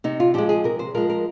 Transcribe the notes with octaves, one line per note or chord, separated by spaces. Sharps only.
C3 D#4
F4
F3 G#3 G4
G#4
C3 A#4
C5
F3 G#3 A#4
A#4